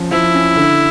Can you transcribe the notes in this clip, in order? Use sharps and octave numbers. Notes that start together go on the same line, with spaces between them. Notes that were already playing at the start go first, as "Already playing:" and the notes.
Already playing: F3 C#4
F3 E4
C#4
D3